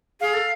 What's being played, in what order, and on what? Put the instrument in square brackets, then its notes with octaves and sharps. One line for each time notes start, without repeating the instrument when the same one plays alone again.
[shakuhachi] G#4 [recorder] F5
[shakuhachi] A4